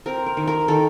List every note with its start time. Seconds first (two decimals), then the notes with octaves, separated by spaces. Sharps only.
0.06 C4 A#4
0.26 A#4
0.37 D#3
0.47 A#4
0.68 D#3 A4